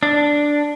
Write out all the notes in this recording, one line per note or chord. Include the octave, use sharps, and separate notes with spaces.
D4